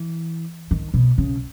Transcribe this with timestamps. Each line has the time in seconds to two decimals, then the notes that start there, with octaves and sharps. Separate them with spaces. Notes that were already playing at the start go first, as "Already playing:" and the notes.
Already playing: E3
0.71 D#3
0.94 B2
1.18 C#3